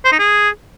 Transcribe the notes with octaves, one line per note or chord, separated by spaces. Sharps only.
C5
D#4
G#4